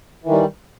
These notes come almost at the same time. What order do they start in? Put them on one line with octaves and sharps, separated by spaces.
E3 D#3 G3